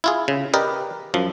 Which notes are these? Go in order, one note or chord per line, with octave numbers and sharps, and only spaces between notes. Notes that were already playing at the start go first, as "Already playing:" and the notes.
E4 F4 G#4
C#3
G4 A#4 B4 D5 D#5
F#2 F3